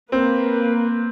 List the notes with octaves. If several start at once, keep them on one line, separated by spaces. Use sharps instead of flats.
A#3 C4 B4